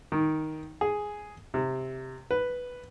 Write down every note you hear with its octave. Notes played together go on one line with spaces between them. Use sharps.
D#3
G#4
C3
B4